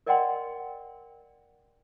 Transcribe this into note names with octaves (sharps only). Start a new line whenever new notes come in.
A#4 D5 D#5 F#5 G5 C6